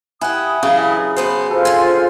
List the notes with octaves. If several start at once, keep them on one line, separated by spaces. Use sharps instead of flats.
E4 G4 F#5 G#5 D#6
C#3 E3 F#3 D4 E4
B2 B3 C5
F4 A4 C5
D3 G#5